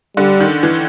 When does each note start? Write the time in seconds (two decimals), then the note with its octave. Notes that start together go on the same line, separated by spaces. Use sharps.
0.17 D3 G3
0.40 D#3
0.63 E3